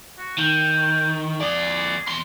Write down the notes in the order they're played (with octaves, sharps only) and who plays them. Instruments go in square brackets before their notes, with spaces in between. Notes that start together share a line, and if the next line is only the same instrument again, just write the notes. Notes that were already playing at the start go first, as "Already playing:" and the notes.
[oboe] F#4
[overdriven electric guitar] D#3 [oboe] G5
[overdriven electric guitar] F2 D5 [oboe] G#4
[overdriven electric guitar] E2 C6